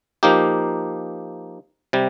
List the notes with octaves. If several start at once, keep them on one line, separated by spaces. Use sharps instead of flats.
F3 A#3 D#4 G4
C3 G3